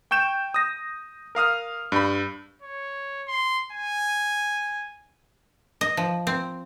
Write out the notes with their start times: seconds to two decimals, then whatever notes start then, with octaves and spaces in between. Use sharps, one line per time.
0.11 G5 C#6 G6 E7
0.54 D#6 A#6
1.35 A#4 F5 D#6 F6
1.92 G2 B5
2.62 C#5
3.28 C6
3.72 G#5
5.81 D#5
5.97 F3
6.27 C4